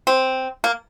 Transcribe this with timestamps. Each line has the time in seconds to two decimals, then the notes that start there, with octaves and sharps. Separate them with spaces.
0.07 C4
0.64 A#3